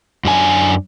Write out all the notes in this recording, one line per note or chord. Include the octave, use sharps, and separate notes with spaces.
F#2 D4 G#5